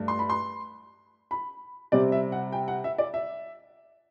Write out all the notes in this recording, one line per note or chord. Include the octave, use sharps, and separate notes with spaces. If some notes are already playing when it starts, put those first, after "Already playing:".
Already playing: G2 A3
C6
B5
C6
B5
C3 G3 C4 D5
E5
F#5
G5
F#5
E5
D5
E5